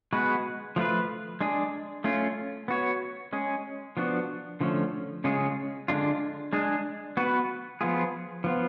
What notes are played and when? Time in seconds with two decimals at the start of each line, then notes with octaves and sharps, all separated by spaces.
0.13 G#3 B3 F#4 B4
0.76 F3 A3 F4 B4
1.41 G#3 D4 G#4
2.04 A3 C#4 F4
2.68 B3 F#4 C#5
3.33 G#3 C#4 G#4
3.97 F3 B3 D4 F#4
4.61 D3 F3 A3 C#4
5.24 C#3 G#3 C#4 F4 G#4
5.88 D3 G#3 D4 F4
6.53 G#3 D4 G#4
7.17 B3 F#4 B4
7.81 F3 B3 F4 G#4
8.44 F3 B3 F4